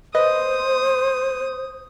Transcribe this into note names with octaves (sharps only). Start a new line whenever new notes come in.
B4 C5 D#5 D#6